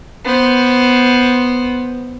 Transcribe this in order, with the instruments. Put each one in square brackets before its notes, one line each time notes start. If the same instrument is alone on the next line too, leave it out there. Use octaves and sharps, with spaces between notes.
[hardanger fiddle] B3 C5